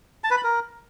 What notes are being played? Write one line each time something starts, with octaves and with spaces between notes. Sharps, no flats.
A5
B4
B5
A#4